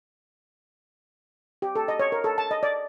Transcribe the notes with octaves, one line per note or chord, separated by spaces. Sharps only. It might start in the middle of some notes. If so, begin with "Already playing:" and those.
G4
A4
D#5
C#5
A#4
A4
A5
D#5
D5